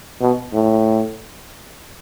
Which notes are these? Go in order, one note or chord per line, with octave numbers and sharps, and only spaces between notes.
B2
A2